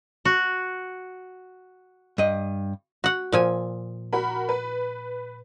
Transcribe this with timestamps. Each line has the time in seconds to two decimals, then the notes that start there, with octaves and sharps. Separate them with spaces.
0.25 F#4
2.18 G2 D#5
3.04 F#4 F#5
3.32 A#2 F3 G#5
4.13 F#4 A#4 B5
4.49 B4